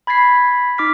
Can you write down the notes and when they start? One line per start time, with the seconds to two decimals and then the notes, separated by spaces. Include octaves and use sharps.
0.07 B5 G#6 A6 B6 C7
0.78 D#4 D6 F6 B6